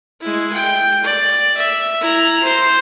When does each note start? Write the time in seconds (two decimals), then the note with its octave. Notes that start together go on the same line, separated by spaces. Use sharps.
0.21 G#3 E4
0.53 G5
1.04 D5
1.58 E5
2.01 E4 A#5
2.43 C5